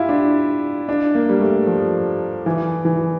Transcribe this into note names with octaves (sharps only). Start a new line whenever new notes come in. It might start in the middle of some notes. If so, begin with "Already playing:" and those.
Already playing: E4 F4 G4
D4
D4
A#3
G3
A3
F3
E3
E3